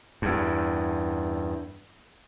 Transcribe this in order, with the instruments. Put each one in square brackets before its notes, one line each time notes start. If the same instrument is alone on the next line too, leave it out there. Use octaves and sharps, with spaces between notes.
[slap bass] E2 G2